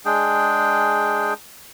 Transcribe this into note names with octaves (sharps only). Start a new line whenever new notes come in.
G#3 D4 G#4 G5